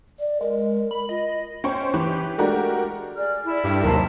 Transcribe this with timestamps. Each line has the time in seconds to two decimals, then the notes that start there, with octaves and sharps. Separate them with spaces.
0.19 D5
0.41 G#3 A#4
0.91 B5
1.09 F4 D#5
1.64 C#4 C5 G5 C#6
1.94 E3 G4 B4
2.38 G#3 A3 D4 F#4 G4 A#4
3.15 G#4 D5 F6
3.45 E4
3.64 G2 G4 A4 G5
3.84 D#2 C3 F#3 A#4 C5 A5 A#5